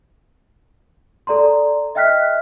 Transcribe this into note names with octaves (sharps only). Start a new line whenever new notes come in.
A4 D5 A#5 C6
D#5 E5 G5 F6 F#6 B6